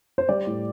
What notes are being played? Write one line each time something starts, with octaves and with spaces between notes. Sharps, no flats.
C5
G3 D5
A2